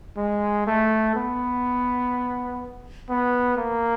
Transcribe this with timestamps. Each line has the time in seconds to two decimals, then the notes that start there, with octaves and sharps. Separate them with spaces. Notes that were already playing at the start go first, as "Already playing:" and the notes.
0.17 G#3
0.67 A3
1.15 B3
3.09 B3
3.57 A#3